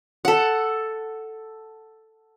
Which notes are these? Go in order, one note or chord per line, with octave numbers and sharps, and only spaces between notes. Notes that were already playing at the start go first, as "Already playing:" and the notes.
A4 F#5